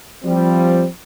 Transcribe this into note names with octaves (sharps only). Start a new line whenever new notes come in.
F3 G3 C4